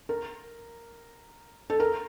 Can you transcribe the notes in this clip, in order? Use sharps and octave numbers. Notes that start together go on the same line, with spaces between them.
A#4
A4
A#4